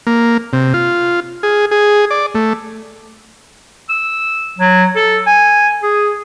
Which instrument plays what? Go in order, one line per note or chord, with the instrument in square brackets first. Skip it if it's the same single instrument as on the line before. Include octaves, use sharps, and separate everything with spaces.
[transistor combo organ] A#3
C3
F4
G#4
G#4
D5
A3
[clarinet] E6
F#3
A4
G#5
G#4